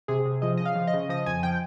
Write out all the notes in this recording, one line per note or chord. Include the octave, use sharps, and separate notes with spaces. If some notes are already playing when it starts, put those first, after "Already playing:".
C3 G#4
C3
F3 D#5
C#3 D#5
F5
F3
D#5
C#3
F3 D#5
F2 G#5
F3 G5